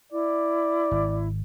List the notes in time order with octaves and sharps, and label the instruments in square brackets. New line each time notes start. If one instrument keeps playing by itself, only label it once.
[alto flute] E4 [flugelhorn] D5
[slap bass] G#1